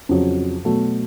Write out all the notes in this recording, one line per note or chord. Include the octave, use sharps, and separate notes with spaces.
F2 C#3 F#3
B2 F#3 A3